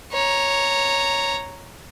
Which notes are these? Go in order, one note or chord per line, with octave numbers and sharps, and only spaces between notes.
C#5 A#5